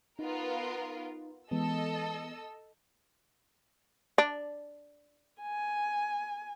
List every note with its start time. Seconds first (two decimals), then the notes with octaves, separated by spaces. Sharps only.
0.19 B3 D#4 F4 A#4
1.51 E3 G#3 B3 A4 D#5 E6
4.18 D4
5.42 G#5